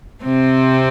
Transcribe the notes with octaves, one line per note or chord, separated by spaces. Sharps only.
C3 C4